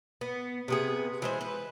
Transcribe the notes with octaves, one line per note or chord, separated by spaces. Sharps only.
B3
C3 B3 G#4
E3 G#3 C5
B4